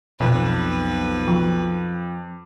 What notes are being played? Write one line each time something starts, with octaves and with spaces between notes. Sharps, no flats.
B1 F2 B2 B4
F3